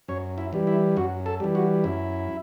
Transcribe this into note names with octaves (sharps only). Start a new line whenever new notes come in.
F#2 C#5
E4
E3 G3
E4
F#2 F#4
A4
E3 G3
F#4
F#2 E4